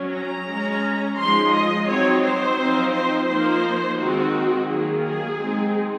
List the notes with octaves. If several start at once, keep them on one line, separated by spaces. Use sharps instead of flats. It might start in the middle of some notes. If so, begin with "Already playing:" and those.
Already playing: F#3 C#4
A#5
G#3 C#4
F3 G#3 D#4 C6
D#5
F#3 C4 D#4 C#5
C5
F3 C4 D#4
C5
F3 A#3 D#4 C5
D#3 G#3 C4 D#4 F#4
D#3 F#3 A#3 G#4
G#4
G#3 C4 D#4